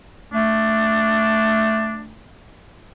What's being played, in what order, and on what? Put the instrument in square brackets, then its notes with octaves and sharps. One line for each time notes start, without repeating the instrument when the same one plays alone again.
[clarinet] A3 [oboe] D4